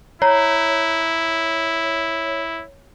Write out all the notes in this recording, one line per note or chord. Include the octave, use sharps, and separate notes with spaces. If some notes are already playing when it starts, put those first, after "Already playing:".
E4 C#5 A#5